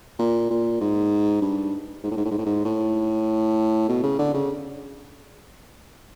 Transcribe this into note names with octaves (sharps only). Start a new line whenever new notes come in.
A#2
A#2
G#2
G2
G#2
A2
G#2
A2
G#2
A2
G#2
A2
B2
C#3
D3
C#3